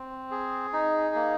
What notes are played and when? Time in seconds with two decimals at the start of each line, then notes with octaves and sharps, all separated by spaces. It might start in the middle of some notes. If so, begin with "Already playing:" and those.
Already playing: C4
0.31 G#4
0.73 D#4
1.15 A#3